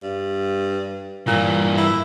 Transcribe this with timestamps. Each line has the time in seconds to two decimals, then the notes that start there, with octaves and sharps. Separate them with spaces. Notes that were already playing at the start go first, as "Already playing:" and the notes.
0.03 G2
1.27 G2 A#2 E3
1.78 E4